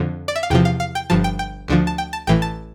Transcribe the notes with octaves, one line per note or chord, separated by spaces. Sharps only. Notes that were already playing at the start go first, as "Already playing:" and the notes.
Already playing: F2 D3 F3
D5
E5
F5
E2 C3 F3 G5
F5
F5
G5
G1 G2 F3 A5
G5
G5
D2 D3 F3
A5
G5
A5
A1 A2 E3 G5
A5